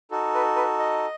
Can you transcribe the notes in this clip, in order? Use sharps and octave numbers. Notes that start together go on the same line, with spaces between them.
D#4 F#4 A4
B4
B4
D#5